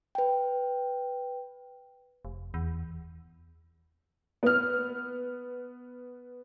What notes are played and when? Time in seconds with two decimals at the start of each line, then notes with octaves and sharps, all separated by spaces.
0.15 B4 G5
2.25 F1
2.54 E2
4.43 B3 F6